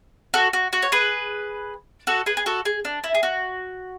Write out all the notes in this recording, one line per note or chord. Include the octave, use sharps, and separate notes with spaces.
F#4 A4
F#4
F#4
C#5
G#4 B4
F#4 A4
G#4 B4
G#4
F#4 A4
G#4
D4
E4
G#4
F#4